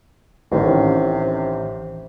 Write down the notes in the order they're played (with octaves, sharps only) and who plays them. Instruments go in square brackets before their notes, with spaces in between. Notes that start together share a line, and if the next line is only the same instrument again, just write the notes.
[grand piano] A1 D#3 C#4 [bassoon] C3